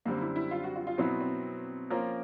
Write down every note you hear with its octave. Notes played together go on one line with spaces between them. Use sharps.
F#2 D3 G3 A#3 C4
E4
E4
F4
F#4
F4
F4
B2 F#3 B3 C4 E4
C4
F3 A#3 C#4 F4 A#4